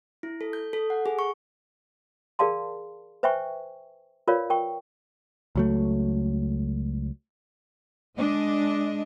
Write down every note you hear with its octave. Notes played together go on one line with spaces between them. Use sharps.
E4
A4
G6
A4
F#5
G#4
C#6
G#4 A#4 D5 F5 A5 C6
B4 C5 E5 G5 G#5 C#6
F4 A#4 B4 C#5 D5 F5
A#4 G5 C#6
C#2 F#3 A3
G#3 D4 D#5